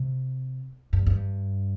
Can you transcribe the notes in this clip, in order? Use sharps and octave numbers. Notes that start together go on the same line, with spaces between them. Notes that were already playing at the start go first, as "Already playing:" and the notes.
Already playing: C3
G2
G2